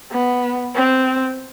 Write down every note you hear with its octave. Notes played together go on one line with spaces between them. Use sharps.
B3
C4